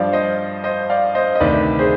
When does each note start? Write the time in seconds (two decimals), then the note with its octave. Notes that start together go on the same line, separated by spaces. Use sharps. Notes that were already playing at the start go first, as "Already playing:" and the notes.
Already playing: G2 F3 D5 F5
0.13 C5 D#5
0.64 C5 D#5
0.90 D5 F5
1.15 C5 D#5
1.35 D#5
1.40 D2 C3 D#3 B4 D5
1.79 G#4 C5